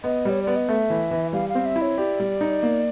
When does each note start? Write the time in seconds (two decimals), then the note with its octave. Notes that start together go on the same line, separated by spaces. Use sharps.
0.04 B3 D#5
0.25 G3 C#5
0.43 B3 D5
0.56 D#5
0.69 A3 E5
0.90 E3
1.11 E3
1.33 G3 F5
1.49 F5
1.55 C4
1.66 E5
1.76 E4
1.82 C#5
1.98 G4 D5
2.20 G3
2.41 D#4
2.63 A#3